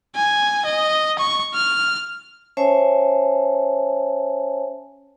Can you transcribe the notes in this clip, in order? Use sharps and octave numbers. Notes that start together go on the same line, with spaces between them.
G#5
D#5
C#6
F6
C#4 C5 C#5 E5 G#5 A5